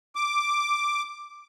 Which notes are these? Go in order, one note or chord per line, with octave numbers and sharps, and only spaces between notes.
D6